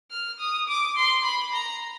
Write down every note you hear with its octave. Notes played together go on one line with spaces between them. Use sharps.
F6
D#6
D6
C6
B5
A#5